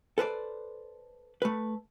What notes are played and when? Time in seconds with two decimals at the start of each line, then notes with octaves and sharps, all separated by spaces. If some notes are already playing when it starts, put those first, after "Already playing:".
0.18 A4 B4 C5 D5
1.42 A3 B4